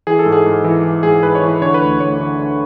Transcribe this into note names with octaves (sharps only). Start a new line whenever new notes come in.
E3 G#4
A4
G#2
G#4
G#2
E3
E3
G#2 G#4
G#2 B4
C#5
E3
B4
D3 C#5
B4
D2
D2 C#5
D3
D3